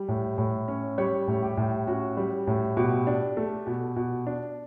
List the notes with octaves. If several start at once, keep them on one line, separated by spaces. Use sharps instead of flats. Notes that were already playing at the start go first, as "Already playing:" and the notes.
Already playing: G3
A2
A2
C#4
G3 C#5
A2
G4
A2
C#4 F#4
G3
A2
B2 G4
D4
A3
B2
B2
D4